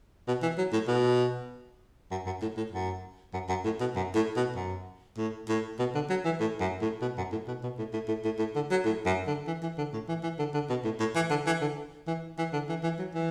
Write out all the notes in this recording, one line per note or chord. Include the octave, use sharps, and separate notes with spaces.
B2
E3
F#3
A2
B2
F#2
F#2
A2
A2
F#2
F#2
F#2
A2
B2
F#2
A2
B2
F#2
A2
A2
B2
D3
F#3
E3
A2
F#2
A2
B2
F#2
A2
B2
B2
A2
A2
A2
A2
A2
D3
F#3
A2
F#2
D3
E3
E3
D3
A2
E3
E3
D3
D3
B2
A2
A2
E3
D3
E3
D3
E3
E3
D3
E3
E3
F#3
E3